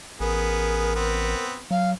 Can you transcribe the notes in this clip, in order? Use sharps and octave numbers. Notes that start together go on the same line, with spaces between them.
A1 B3 G#4 A#4
B3 C4
F#3 F5